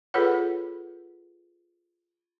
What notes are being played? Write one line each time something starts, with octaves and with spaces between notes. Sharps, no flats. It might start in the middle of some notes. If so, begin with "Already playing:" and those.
F4 G#4 A4 B4 C#5 F#5